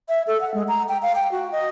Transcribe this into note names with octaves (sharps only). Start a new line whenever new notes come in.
E5
A4
F#5
G#3
A#5
G5
F5
G5
F#4
D#5